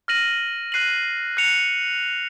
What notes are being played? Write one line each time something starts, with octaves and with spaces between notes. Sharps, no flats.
F6 A#6 D#7 F#7
F#6 C7 D#7 F#7
F#6 C#7 F7